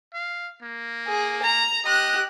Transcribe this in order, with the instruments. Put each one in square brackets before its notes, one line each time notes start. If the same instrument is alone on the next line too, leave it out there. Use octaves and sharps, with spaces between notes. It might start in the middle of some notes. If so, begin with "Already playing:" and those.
[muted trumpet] F5
A#3
[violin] G#4
A#5
[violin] G4 F#6 [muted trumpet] D#5